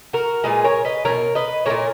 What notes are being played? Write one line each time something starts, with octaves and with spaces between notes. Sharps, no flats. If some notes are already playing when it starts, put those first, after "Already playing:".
F#4 A#4
A#2 G#3 G#4 B4
A#4 C#5
B4 D#5
B2 F#3 A#4 C#5
B4 D#5
A#2 G#3 A#4 C#5